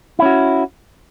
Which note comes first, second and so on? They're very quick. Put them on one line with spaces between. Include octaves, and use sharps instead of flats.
E4 C#4 F#4